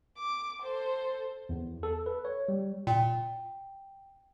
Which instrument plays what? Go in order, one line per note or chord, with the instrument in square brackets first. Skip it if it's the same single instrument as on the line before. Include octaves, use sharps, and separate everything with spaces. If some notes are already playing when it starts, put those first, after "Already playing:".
[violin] D6
A4 C5
[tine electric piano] E2
A4
B4
C#5
G3
[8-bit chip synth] A#2 [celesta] G5